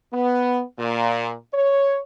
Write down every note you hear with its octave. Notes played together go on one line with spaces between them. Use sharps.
B3
A#2
C#5